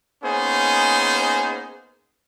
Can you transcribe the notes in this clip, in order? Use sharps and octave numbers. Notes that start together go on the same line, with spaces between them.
A#3 B3 C#4 D#4 G#4 C5